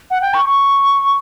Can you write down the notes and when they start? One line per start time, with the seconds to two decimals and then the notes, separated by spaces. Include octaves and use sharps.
0.10 F#5
0.21 G5
0.34 C#6
0.45 C#6